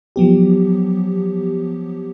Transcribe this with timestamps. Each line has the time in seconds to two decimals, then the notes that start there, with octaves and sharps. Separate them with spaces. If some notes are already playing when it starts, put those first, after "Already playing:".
0.16 F3 F#3 B3 G4